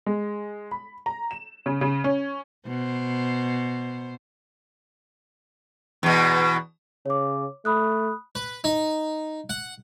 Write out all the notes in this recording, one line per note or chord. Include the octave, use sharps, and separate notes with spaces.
G#3
B5
A#5
E7
C#3
C#3
C#4
B2 C5
E2 B2
C#3 C#5 D6
A3 B5 D#6 F#6
B4
D#4
F#5